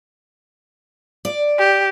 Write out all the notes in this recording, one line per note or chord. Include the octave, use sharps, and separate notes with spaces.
D5
G4